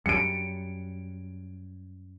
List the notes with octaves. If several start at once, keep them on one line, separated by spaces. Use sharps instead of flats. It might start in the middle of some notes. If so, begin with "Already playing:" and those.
F#2 G3 C#7 D7